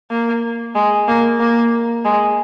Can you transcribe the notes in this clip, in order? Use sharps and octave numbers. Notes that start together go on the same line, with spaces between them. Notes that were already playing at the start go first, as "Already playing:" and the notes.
A#3
G#3
A#3
A#3
G#3